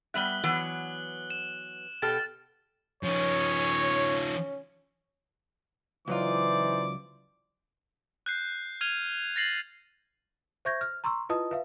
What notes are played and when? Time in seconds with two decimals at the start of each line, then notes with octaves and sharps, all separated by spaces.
0.14 G3 B3 E5 F#6 F#7 G7
0.44 E3 F#3 B3
1.30 E7
2.02 B2 G4 A4 F6 A6
3.03 F3 C#4 D#4 C#5
6.08 C#2 E3 F#3 D#4 F4 C5 D5 D6
8.26 F#6 G6 C7
8.81 F6 G#6 D#7 F7
9.36 A6 A#6 C7 F#7
10.65 C5 E5 C#6 G6 G#6 A#6
10.81 F6
11.04 A#5 C6 C#6 E6
11.29 E4 F4 B4 D#5 A5 D#6
11.51 B4 E5 F5